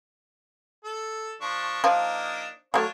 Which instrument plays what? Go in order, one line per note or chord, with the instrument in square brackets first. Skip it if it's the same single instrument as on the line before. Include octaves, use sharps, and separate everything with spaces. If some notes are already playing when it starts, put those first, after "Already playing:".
[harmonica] A4
F3 D4 C#6
[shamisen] F3 [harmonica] A#3 D4 D#4
[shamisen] F#3 A3 [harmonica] D4 F4 C#5